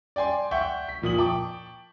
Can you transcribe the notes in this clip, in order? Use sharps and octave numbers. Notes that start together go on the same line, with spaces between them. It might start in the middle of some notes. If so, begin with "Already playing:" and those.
D5 G5 G#5 C6
E5 F#5 G5 C#6 G6
B6
F2 A#2 D#6 F#7
G5 A5 C#6 D6